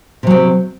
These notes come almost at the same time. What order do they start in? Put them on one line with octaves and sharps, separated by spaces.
C3 F#3 C4